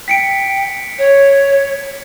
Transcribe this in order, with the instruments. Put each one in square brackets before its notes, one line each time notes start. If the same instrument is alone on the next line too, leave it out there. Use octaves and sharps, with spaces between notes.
[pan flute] G5 [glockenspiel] B6 C#7 D7
[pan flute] C#5